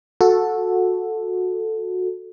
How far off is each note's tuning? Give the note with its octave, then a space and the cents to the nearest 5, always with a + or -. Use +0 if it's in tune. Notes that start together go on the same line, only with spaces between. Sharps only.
F#4 -20 A4 +0